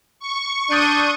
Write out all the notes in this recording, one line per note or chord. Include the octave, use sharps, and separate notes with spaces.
C#6
D4 D#6 G6 D#7